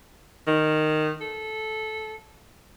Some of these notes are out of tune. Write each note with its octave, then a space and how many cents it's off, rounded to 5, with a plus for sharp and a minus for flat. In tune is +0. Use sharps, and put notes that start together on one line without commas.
D#3 -10
A4 -15